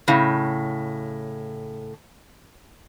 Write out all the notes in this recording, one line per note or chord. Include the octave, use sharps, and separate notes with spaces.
A2 C#3